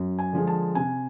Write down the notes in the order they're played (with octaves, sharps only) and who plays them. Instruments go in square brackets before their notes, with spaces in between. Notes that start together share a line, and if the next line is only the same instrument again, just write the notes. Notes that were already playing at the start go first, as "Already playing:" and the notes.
Already playing: [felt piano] F#2
G#5
D3 F3 G#3
A5
C3 G#5